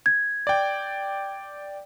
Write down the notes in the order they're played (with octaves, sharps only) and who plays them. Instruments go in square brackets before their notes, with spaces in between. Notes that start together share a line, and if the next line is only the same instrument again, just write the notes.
[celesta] G#6
[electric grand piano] D5 G5